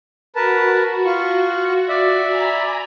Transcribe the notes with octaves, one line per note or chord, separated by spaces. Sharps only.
F#4 A#4 B4 A5
F4 C#6
D5 E5
G#5 A#5 B5